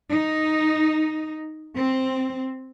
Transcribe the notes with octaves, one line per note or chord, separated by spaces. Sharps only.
D#4
C4